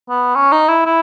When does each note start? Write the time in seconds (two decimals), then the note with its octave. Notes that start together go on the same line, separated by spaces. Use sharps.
0.09 B3
0.35 C#4
0.52 D#4
0.68 E4
0.86 E4